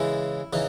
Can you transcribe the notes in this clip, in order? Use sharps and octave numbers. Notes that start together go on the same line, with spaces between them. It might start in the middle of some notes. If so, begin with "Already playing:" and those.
Already playing: C#3 E3 G#3 E4
C#3 E3 D#4